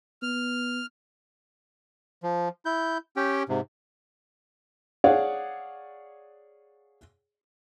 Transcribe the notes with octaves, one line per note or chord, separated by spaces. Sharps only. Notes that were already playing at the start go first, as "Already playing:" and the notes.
B3 F6
F3
E4 G6
C#4 G4 G5
G#2 C3
G#4 C#5 D5 F5 F#5